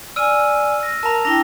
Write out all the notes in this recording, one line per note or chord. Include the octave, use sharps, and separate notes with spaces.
D5 G#5 E6 F6 D#7
A#6
A#4 A5 A#5
D4 E4 G5 A#6